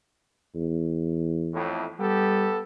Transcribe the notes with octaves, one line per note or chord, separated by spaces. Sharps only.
E2
F2 A2
G3 B3 G4 A4